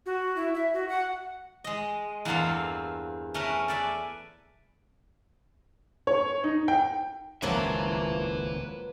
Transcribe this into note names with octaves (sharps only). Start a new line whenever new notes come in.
F#4
E4
E5
F#4
F#5
G#3 D#5
E2 G2 A#3 C4 A4 F5
A3 C#4 A#4 B4
A4 B4 D5 E5 G#5
C#5
D#4
G5
D#1 C#2 A2 F3 F#3 A#3 B4 E5